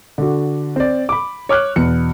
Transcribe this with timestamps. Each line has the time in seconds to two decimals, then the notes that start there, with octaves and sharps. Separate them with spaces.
0.18 D3 F#4
0.76 C4 D5
1.09 B5 D6
1.49 C#5 D6 F6 F#6
1.76 E2 B2 C#7